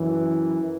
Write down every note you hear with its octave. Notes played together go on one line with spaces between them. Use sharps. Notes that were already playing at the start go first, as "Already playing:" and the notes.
Already playing: F#2 E3